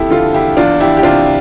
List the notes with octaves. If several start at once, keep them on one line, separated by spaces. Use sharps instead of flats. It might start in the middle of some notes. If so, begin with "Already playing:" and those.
Already playing: F2 E4 G4 A4
D3 F4 A4
E4 G4
E2 D4 F4
E4 G4
G4
C3 D4 F4